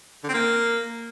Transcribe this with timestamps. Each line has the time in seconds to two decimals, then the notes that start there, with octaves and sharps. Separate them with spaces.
0.24 D3
0.29 C4
0.34 A#3